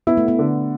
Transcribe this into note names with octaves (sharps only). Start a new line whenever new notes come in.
B3 E4
A3
B3
D3